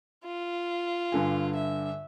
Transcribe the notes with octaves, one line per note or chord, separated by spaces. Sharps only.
F4
G2 D3 G#5
E5